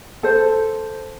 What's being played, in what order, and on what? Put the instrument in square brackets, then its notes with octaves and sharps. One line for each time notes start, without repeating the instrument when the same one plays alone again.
[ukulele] A4 C5